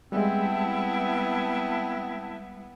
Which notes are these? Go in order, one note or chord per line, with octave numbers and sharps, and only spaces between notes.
G3 G#3 B3 C4 E4 A5